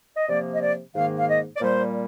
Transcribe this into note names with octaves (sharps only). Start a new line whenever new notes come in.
D#5
C3 F3 A#3 D5
D#5
D5
G#2 D#3 A#3 F5
F5
D#5
D5
A#2 G3 A#3 C5